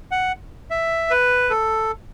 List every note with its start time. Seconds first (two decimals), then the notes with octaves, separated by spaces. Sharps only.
0.11 F#5
0.70 E5
1.10 B4
1.50 A4